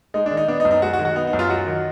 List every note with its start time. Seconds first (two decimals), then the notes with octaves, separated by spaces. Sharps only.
0.14 G#3 D#4
0.26 D4
0.31 D#3
0.37 D#4
0.48 B3 D4
0.60 D#4
0.65 F#2
0.71 D#4
0.82 G#3 F#4
0.93 F#4
0.99 D#3
1.05 F#4
1.16 B3 D#4
1.27 D#4
1.33 F#2
1.39 F4
1.50 F#3 F#4
1.67 D#3